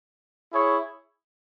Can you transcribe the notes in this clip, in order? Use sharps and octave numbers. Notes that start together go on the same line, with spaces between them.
E4 G#4 C#5